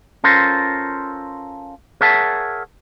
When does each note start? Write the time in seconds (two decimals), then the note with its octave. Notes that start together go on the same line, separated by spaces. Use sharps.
0.24 C#4 F4 A4 A#4 C5
2.01 G#4 A#4 C#5 E5 F#5 A5